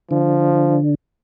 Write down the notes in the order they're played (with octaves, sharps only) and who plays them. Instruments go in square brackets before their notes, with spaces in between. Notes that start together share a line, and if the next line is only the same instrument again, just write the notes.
[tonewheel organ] D3 [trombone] F3